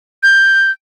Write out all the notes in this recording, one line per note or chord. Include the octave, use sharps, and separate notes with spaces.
G6